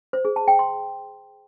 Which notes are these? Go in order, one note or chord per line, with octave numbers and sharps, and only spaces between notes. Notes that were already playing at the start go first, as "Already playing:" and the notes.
C5
G#4
A5
G5
C6